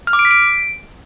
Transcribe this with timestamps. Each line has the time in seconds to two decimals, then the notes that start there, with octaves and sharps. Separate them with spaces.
0.07 F6
0.13 D6
0.19 D7
0.25 B6
0.31 D7